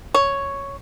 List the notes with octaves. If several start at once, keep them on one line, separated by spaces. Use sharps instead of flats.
C#5